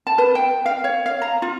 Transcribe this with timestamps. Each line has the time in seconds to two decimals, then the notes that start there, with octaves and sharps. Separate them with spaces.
0.07 A5
0.18 B4
0.35 G5
0.66 F5
0.84 C#5
1.06 F5
1.22 A#5
1.42 F4